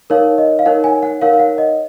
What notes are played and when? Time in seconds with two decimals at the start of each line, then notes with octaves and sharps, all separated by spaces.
0.10 D#4 A#4 C#5 F5
0.38 D#5
0.59 F5
0.66 D#4 A#4 C#5 F#5
0.84 G#5
1.03 F#5
1.21 D#4 A#4 C#5 F5
1.34 F5
1.39 F#5
1.58 D#5